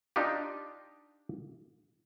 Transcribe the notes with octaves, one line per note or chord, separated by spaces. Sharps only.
D4 D#4 F4 G4